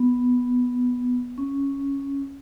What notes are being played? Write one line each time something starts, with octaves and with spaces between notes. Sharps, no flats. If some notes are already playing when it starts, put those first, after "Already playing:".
Already playing: B3
C#4